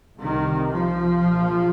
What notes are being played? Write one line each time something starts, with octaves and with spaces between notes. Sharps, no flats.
C2 C3 D#3
F3
A#1 A#2